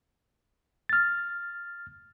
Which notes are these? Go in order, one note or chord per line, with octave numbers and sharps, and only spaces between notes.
F6 A6